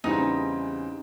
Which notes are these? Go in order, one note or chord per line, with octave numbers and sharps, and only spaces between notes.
E2 C#3 E3 G3 C4 D#4